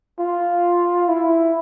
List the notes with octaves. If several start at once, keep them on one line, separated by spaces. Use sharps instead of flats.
F4
E4